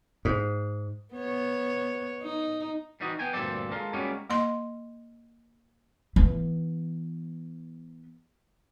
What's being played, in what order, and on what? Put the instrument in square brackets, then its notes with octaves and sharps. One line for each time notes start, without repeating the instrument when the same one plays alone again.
[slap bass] G#2
[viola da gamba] B3 C#5
D#4
[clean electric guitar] E3 G3 D#4 F#4 D#5
B3 G5 G#5
D2 G2 A#2 C4 A4 D5
G#3 F4 A4 A#4
G3 G#3 A#3 B3 C#4 F#4
[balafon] A#3 D#5 C6
[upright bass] E3 B3